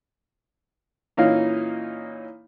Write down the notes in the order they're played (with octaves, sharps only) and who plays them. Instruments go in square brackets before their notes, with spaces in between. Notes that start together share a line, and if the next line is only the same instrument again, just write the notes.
[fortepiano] A#2 E3 A#3 C#4 D#4 F5